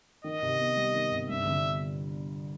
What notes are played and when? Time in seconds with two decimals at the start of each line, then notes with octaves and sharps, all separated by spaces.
0.24 D#3 D#5
0.42 C3
0.59 B3
0.77 G3
0.95 D#3
1.12 C3
1.29 G2 E5
1.46 G1